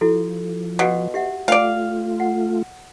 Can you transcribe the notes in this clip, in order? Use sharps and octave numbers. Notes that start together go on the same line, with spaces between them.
F3 E4 F#4 A4
B2 F#4 F5 F#5
G4 E5 F#5
A3 F4 D5 F5 G5
F#5